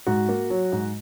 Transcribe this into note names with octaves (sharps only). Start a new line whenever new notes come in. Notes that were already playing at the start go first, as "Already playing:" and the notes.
G#2 F#4
A#3
F#3
G#2